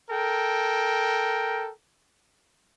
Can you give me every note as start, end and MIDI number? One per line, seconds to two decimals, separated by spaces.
0.10 1.70 69
0.10 1.70 70
0.10 1.70 79